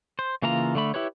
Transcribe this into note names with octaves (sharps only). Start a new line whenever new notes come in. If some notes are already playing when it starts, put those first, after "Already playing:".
C5
C#3 E3 A#3 F4 A#5
D3 A3 B5
E4 G4 B4 C#5